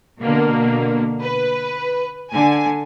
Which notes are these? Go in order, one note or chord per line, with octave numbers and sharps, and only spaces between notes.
B2 D3 A#3
B4
D3 G#5